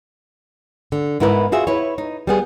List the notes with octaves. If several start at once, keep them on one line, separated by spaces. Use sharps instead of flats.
D3
G#2 B3 E4 A#4 B4
F4 F#4 G#4 E5
E4 B4 C#5
D#4
G3 B3 G#4